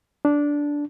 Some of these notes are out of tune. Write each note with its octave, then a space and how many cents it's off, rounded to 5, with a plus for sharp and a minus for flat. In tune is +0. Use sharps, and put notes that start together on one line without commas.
D4 -10